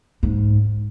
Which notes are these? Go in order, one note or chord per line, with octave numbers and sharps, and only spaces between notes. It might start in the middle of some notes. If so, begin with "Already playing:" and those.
G#2